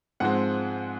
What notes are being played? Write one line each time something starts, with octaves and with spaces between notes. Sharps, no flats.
G#2 F3 G#3 C4 F#5